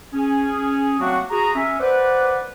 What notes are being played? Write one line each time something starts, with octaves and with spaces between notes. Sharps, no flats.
C#4 G#4
F#3 A3 A#3 C4 D4 F#4
F#4 G#4 A#5
C#4 E5
B4 C5 D5 F#5